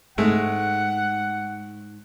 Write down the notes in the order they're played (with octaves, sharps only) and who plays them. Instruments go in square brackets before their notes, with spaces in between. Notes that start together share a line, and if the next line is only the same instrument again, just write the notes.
[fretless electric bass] G#2 [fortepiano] G#3 A3 [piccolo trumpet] F#5